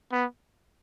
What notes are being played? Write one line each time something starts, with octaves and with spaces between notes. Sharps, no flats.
B3